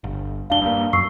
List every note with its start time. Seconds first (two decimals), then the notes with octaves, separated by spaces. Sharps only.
0.04 G1
0.50 E1 D4 F5 G7
0.61 G2 A#3
0.93 F#2 C#6 E6 C7